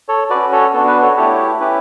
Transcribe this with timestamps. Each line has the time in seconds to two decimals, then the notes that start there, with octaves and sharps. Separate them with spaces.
0.08 A4 C#5
0.30 C#4 F#4 B4 D5
0.52 A4 C#5
0.73 B3 D4 F#4 A4
0.87 B4
1.02 A4 C#5
1.17 A3 E4 G4 A4 C#5
1.60 C#4 E4 G4 B4